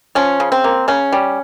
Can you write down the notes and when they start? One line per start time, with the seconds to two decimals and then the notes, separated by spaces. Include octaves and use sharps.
0.15 F3 C#4
0.40 C#3
0.52 C4
0.64 A#3
0.88 C#3 C#4
1.13 G3